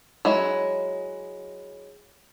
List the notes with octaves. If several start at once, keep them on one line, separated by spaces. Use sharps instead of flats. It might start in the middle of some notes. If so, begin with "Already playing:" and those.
F#3 G#3 E4